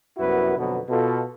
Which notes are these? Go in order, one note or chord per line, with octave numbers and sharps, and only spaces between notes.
C2 F#2 B3 E4 F#4 B4
F2 B2 D3 F#3 B3
B2 F4 A4